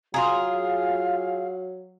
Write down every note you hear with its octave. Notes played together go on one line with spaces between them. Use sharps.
F#3 F4 G#4 F5 A#5 C6